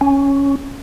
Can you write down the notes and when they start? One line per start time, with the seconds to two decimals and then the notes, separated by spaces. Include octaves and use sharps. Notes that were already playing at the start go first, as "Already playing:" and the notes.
0.01 C#4